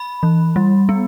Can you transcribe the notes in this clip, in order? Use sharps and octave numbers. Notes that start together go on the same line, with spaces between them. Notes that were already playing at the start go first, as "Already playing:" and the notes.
Already playing: B5
E3
G3
B3